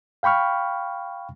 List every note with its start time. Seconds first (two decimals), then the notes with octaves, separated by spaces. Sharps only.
0.23 F5 G5 B5 C#6 F6